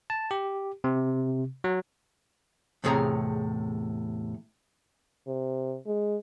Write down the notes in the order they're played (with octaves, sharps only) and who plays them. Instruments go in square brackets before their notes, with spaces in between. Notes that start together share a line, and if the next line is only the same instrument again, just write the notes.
[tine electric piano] A5
G4
C3
F#3
[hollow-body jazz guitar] E2 A2 C3 G#4 C#5 A#5
[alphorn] C3
G#3